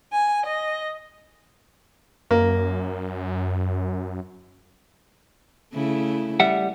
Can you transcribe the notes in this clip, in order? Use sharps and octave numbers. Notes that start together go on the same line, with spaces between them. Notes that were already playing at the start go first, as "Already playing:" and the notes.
G#5
D#5
F#2 A#3
C#3 A3 E4
G3 E5 F#5